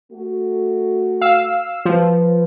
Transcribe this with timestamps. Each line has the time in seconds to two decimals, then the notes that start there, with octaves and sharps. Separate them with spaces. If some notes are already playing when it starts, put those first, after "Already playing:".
0.12 A3 F#4
1.21 F5 E6
1.85 F3 B4